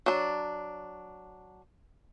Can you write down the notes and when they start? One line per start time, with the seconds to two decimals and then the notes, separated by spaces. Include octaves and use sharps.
0.06 F#3 D4